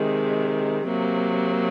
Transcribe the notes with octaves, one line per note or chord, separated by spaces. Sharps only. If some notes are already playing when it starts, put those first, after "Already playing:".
Already playing: C3 D#3 G#3
C3 F#3 A#3